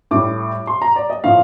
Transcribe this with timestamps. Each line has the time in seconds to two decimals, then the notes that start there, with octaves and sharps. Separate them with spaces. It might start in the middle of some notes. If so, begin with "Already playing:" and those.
0.11 A2 G3 D6
0.67 C6
0.82 A#5
0.96 D5
1.10 D#5
1.24 A2 F3 F5